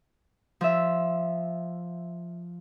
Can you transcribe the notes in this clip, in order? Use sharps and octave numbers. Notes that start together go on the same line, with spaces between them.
F3 E5